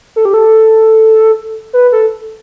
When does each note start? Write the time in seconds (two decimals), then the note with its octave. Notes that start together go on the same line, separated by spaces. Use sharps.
0.16 A4
0.25 G4
0.34 A4
1.73 B4
1.92 A4